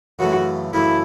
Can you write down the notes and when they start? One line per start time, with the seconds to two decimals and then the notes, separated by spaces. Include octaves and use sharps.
0.19 F#2 C#3 E3 A3 F#4
0.73 F#2 C#3 E3 A3 E4